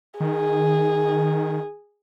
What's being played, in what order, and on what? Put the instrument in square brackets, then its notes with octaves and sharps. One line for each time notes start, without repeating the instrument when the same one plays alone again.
[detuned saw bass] D#3 [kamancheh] G#4